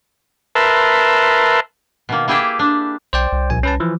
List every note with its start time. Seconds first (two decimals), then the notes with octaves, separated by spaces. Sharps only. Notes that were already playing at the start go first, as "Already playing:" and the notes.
0.55 A#4 B4 E5 A5 C6
2.09 B2 D#3 A#3
2.28 A#3 E4 G4 G#4 G5 A5
2.59 D4
3.13 B1 C5 D5 G5
3.32 C2
3.50 A#1 G#5
3.63 C#4 B4 A5
3.80 E3 F3